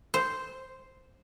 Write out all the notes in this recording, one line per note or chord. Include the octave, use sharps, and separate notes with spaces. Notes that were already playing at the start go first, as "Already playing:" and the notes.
C5